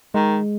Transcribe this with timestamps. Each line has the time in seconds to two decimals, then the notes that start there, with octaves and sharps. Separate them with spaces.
0.14 D#3 G#3